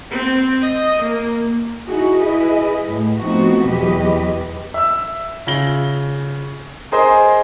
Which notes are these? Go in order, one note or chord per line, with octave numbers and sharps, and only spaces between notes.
C4
D#5
A#3
D#4 E4 F#4 G#4
E4 G#4 B4 D#5
A2
F3 A3 B3 C4 D#4 F#4
E2 B2 F#3 G4 B4 D#5
E5 E6
C#3 F4 A#6 G7
G#4 A#4 C5 D#5 G#5